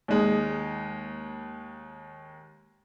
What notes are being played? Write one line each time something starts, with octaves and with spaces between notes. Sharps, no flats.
D#2 G#3